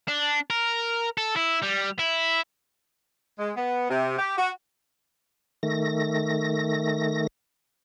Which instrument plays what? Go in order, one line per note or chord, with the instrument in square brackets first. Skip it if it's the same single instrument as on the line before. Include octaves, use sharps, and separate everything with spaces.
[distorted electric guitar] D4
A#4
A4
E4
G3
E4
[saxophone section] G#3
B3
C3
G4
F#4
[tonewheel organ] D#3 A3 A#6